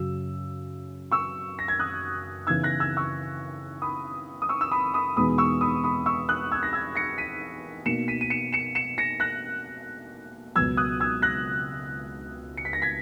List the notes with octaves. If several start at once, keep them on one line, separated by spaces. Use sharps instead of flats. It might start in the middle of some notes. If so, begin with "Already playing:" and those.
Already playing: F#2 C#3 F#3 E6
C#6 E6
A#6
G#6
D#6 F#6
C#3 E3 B3 D#4 E6 G#6
F#6 A#6
E6 G#6
C#6 E6
B5 D#6
D#6
C#6 E6
E6
B5 D#6
B5 D#6
E2 B2 G#3 B3 D#4 B5 D#6
C#6 E6
B5 D#6
B5 D#6
C#6 E6
D#6 F#6
E6 G#6
A#6
E6 G#6
A#6 C#7
B6 D#7
B2 A#3 D#4 C#7 E7
B6 D#7
D#7
C#7 E7
C#7 E7
C#7 E7
A#6 C#7
F#6 A#6
C#2 B2 F#3 B3 E6 G#6
D#6 F#6
E6 G#6
F#6 A#6
C#7
B6
A#6
G#6 B6